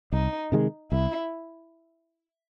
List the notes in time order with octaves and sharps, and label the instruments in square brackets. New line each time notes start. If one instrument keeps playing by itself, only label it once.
[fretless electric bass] C2 [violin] D#4
[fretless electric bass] C3 D#3 G#3
[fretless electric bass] C2 [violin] E4